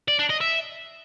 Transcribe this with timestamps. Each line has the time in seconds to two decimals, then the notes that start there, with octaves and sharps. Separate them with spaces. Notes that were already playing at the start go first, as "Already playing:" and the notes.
0.08 D5
0.19 D4
0.30 D#5
0.41 E5